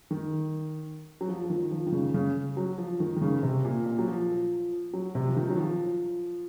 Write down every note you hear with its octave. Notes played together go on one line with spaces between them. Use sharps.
D#3
F#3
F3
F3
D#3
F3
D#3
C#3
C#3
F#3
F3
D#3
D#3
C#3
C3
A#2
A#2
F#3
F3
F#3
C3
F3
D#3
F#3
F3